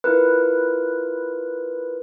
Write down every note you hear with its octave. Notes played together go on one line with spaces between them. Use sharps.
E4 F4 A#4 B4